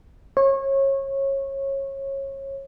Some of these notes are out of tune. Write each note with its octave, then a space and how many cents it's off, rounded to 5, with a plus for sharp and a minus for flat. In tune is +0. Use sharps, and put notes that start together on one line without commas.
C#5 -25